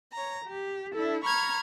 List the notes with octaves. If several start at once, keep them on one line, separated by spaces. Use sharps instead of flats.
C#5 A#5
G4
D4 E4 A4
A#5 B5 C#6 F6 G#6